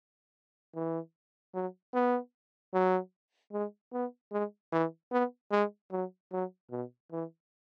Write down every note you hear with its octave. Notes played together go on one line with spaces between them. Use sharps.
E3
F#3
B3
F#3
G#3
B3
G#3
E3
B3
G#3
F#3
F#3
B2
E3